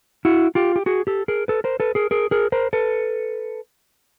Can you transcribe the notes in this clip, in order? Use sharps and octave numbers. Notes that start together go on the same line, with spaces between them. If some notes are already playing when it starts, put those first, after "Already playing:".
E4 F#4
F4 G4
G4
F#4 G#4
G4 A4
G#4 A#4
A4 B4
A#4 C5
A4 B4
G#4 A#4
G#4 A#4
G#4 A#4
A#4 C5
A4 B4